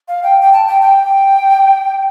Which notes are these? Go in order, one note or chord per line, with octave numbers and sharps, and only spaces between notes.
F5
G5
G5
A5
G5
G5